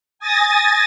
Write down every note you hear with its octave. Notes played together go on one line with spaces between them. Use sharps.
G#5 D#6 A6 A#6